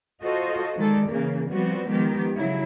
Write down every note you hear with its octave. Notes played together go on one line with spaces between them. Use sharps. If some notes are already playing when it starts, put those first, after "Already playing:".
F4 F#4 A4 C5 D#5
D#3 G#3 A4 D5
C#3 E3 A#3
F3 G3 B3 C4 F#4
D#3 F3 G#3 B3 G4
C#3 F#3 E4